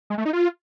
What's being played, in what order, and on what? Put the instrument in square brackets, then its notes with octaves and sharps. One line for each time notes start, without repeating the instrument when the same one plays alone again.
[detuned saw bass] G#3
A3
D#4
F4